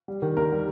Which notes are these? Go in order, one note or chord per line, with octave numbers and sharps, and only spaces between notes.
G3
D#3
D#2 A#4
G3